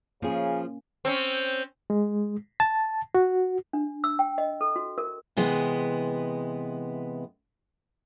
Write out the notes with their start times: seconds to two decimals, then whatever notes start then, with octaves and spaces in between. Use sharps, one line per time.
0.22 C#3 F3 A#3 C#4 G#4
1.05 C4 C#4
1.90 G#3
2.60 A5
3.15 F#4
3.73 D4
4.04 E6
4.19 G5
4.38 D#5
4.61 A4
4.76 F#4
4.98 A#4
5.37 C3 E3 G#3 B3